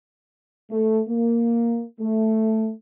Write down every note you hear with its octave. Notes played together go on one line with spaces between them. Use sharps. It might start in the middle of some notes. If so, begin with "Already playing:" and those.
A3
A#3
A3